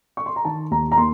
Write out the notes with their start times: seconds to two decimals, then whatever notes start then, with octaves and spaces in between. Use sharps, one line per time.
0.17 C#6
0.26 C6
0.36 A#5
0.45 D#3 A5
0.71 D#2 A#5
0.92 A#5
0.98 A#3 C6